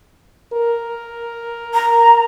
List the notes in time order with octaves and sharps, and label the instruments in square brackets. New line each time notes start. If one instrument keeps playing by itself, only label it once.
[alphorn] A#4
[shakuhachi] A#5